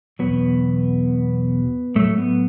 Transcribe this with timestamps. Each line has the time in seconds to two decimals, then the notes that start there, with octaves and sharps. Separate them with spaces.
0.19 E2 B2 F#3 B3
1.95 A2 F#3 A3
2.18 B3